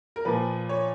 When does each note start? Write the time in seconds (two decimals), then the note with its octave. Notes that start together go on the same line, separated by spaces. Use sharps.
0.16 A#4
0.25 A#2 F3 B4
0.69 C#5